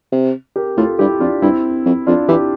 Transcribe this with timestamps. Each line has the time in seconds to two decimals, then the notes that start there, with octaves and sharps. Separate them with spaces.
0.12 C3
0.56 G4 A#4
0.77 A2 F4 A4
0.99 G2 E4 G4
1.20 F2 D4 F4
1.42 G2 C4 E4
1.86 F2
2.07 F2 D4 F4
2.28 E3 E4 G4